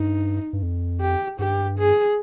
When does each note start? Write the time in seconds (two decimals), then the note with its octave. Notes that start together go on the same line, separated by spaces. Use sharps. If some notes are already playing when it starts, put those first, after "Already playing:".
Already playing: G2 D#4
0.53 G2
0.63 F2
1.01 G4
1.39 G2 G4
1.78 G#4